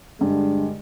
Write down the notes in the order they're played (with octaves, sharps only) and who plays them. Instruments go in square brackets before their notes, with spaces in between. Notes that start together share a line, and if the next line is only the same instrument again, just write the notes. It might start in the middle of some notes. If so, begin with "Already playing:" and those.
[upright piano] G2 [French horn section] D3 G#3